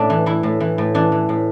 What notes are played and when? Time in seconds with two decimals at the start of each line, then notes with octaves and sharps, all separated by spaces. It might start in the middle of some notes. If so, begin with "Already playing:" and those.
Already playing: A2 D4 E4
0.10 E3
0.26 E3 E4
0.43 A2
0.60 E3
0.78 A2
0.95 E3 D4
1.12 E3
1.29 A2